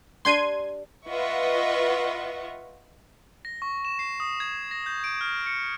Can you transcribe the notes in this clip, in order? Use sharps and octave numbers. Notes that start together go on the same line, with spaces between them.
D4 G4 C6 G#6 D#7
F4 B4 D#5 E5 F#5 C#6
A#6
C#6
E7
C7
D#6
G#6
A#6
G6
D7
F6
C#7